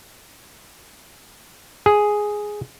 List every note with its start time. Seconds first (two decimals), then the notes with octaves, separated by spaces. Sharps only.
1.86 G#4